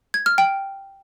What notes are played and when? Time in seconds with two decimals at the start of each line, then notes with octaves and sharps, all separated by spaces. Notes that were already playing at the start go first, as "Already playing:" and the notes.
0.14 G#6
0.26 F6
0.38 G5